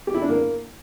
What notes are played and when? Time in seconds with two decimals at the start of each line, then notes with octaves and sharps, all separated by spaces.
0.07 G4
0.14 E4
0.22 D4
0.29 A#3